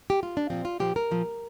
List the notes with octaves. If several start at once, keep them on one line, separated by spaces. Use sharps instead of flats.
G4
F4
D4
A#2 F3 C4
F4
A#2 F3 G4
A#4
A#2 F3